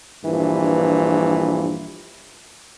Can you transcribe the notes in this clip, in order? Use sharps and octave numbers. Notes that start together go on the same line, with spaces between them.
A#1 G2 E3